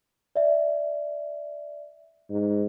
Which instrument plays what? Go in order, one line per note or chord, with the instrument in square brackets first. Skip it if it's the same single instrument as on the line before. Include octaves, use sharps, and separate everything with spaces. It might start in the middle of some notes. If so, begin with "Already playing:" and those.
[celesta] D5 E5
[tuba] G#2